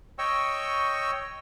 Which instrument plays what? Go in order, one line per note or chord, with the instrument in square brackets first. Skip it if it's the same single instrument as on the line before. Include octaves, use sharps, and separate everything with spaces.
[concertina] C#5 D#5 G5 C#6 E6